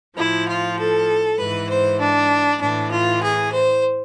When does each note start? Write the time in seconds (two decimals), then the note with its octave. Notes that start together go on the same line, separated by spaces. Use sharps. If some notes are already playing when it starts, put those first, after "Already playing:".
0.17 A2 F3 E4
0.48 F4
0.78 A4
1.40 G#2 E3 B4
1.69 C5
2.00 D4
2.61 A2 E3 D4
2.91 F4
3.22 G#4
3.52 C5